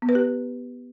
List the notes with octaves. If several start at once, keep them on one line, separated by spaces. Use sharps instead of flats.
B3
B4
G4